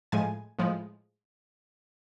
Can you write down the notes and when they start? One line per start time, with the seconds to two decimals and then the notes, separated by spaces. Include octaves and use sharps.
0.12 A2 F3 G#3 G#5
0.59 A2 F3 G#3